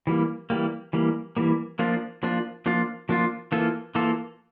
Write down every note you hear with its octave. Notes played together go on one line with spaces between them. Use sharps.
E3 G3 A#3
E3 G3 A#3
E3 G3 A#3
E3 G3 A#3
F3 A#3 D4 F4
F3 A#3 D4 F4
F3 A#3 D4 F4
F3 A#3 D4 F4
E3 A#3 F4 A4
E3 A#3 F4 A4